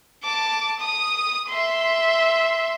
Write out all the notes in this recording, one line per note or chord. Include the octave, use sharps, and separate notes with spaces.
A5 D6
D#6
E5 C6